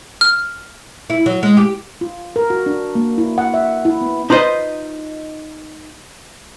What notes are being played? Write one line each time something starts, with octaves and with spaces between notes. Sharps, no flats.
F6
E4
F#3
G#3
G4
F4
A#4
F#4
D4
A#3
E4
F#5
E5
E4
B3
D#4 F4 B4 C5 D#5